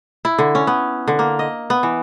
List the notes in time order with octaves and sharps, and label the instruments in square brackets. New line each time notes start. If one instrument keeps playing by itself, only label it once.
[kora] E4
D3
C#4
B3
D3
A#3
D#5
B3
E3